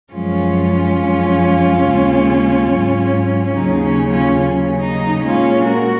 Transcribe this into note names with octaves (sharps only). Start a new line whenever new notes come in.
F#2 F3 G#3 C#4 F4
F#2 F3 G#3
D#2 C#3 G#3
G#2 F#3
D#2 C#3 F#3 D#4
C#4
C#4 F4
D#2 C#3 F#3 C#4
D#4
A#2 G#3 C#4 F4
F#4 A#4